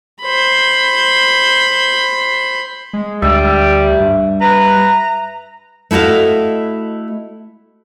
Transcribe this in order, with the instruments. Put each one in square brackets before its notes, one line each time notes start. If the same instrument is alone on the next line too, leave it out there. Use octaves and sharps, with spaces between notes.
[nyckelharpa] C5 B5
[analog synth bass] G#3
[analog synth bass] D2 [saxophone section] G3 [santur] E5
[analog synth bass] G2
[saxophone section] B4 [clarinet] A#5
[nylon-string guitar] A3 E4 F#4 D#5 F5